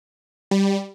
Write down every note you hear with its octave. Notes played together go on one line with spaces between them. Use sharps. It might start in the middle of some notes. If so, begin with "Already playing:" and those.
G3